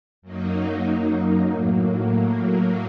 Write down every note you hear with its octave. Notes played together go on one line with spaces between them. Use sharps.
F#2 F#3 A#3 D#4
A2 F#3 A#3